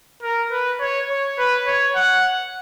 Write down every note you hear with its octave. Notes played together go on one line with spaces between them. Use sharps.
A#4
B4
C#5
C#5
B4
C#5
F#5